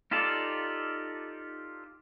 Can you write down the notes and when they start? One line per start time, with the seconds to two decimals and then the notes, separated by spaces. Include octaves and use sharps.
0.11 D#4 F4 G4 A4 D5